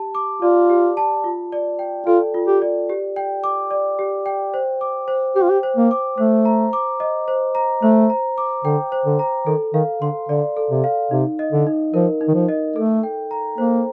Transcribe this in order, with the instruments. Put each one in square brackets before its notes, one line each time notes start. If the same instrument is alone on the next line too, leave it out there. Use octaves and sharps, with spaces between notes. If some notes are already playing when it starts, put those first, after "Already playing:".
Already playing: [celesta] G4 A5
D6
[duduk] F4 [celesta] D5
[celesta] G4
A5
F4
D5
G5
[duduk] F4 [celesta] A4
[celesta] F4
[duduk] G4
[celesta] D5
G4
G5
D6
D5
G4
G5
C5
D6
C5
[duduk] G4 [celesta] G5
[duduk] F4
G4
[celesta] C5
[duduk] A#3
[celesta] D6
[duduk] A3 [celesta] C5
[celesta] A#5
D6
D#5
C5
A#5
[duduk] A3 [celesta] C5
[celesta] A#5
D6
[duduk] D3 [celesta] G5
[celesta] C5
[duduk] D3
[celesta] A#5
[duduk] D#3 [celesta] A4
[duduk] D#3 [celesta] F5
[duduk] D3 [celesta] C6
[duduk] D3 [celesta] D5
[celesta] A4
[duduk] C3
[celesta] F5
[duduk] C3 [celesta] D#4
[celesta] D#5
[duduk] D3
[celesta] D#4
[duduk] F3 [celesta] A#4
[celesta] D#4
[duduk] D#3
F3
[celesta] D#5
[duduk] A3 [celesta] A4
[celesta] G5
A#5
[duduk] A#3 [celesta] C5